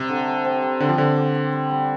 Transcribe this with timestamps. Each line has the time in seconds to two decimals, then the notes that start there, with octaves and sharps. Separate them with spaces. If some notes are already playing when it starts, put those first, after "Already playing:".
Already playing: C3 G3 C4
0.09 D3
0.27 G4
0.45 C4
0.62 G3
0.80 D3 C4
0.89 F3
0.98 D3 C4
1.16 G4
1.35 G4
1.53 G3
1.70 G3